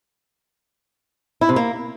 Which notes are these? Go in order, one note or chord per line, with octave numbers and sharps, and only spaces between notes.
E4
C3
A#3